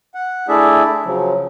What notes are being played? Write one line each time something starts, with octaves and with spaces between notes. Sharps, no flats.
F#5
A3 D4 E4 G#4 D5 E5
C#3 F3 F#3